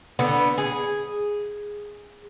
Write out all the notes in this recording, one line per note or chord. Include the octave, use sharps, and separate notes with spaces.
D3 B3
G#4